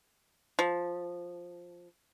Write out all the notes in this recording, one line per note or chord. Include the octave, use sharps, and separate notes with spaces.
F3